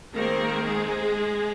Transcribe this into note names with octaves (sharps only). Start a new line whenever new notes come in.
D#3 G#3 A#3 C4 A#4
G#3 G#4